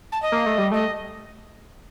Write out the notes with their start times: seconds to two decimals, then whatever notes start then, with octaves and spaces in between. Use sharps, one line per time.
0.12 A5
0.22 D#5
0.32 A#3
0.46 A3
0.58 G3
0.72 A3 D#5